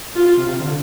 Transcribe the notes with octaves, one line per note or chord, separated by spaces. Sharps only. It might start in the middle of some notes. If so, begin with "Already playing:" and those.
F4
C3
C3
D3